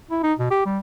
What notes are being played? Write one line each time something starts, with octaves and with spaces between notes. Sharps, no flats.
E4
D#4
B2
G4
G3